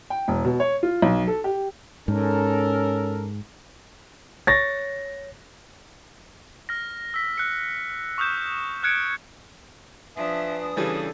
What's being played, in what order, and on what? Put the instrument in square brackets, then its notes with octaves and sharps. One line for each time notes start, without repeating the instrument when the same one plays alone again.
[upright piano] G5
E1
B2
C#5
F4
B1
A4
G4
[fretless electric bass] G#2 [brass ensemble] C#4 A4 A#4
[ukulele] C#5 [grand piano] A6 A#6
[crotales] F6 A#6
E6 B6
F#6 C#7
C#6 D#6 F6 G6 E7
F6 F#6 G#6 C#7 D7
[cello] F3 D4 [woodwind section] B4 G#5 D#6 [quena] E5
[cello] C#3 D4 [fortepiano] E3 G3 C#4 [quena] A4